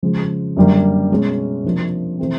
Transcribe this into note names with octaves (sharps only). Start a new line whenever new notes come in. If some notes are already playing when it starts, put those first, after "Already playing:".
C#3 F3 G#3
F#2 D3 G3 A#3
B2 G#3 C#4
C3 F3 A#3 D4
C3 E3 A3 C4